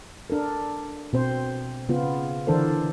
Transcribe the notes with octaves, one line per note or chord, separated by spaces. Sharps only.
D4 A4 A#4
B2 C4 C5
C#3 B3 F4
D3 E3 D4 A4 A#4 C5